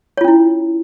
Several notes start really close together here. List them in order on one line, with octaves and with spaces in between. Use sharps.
C#5 F4 C#4 E4